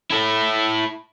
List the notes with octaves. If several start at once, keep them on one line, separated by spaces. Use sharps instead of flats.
E4 A4